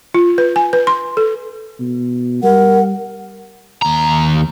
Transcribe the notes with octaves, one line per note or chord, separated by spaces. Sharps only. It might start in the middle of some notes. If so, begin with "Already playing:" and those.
F4
B4
G#5
B4
C6
A4
B2
G3 A#4 F#5
D#2 A#5